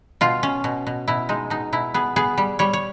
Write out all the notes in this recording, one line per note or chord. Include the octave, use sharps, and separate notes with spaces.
B2 F4
C#4
B2
B2
B2 E4
G#3 D#4
B2 D#4
B2 E4
B3 G#4
B3 G#4
G3
G3 C#5
C#5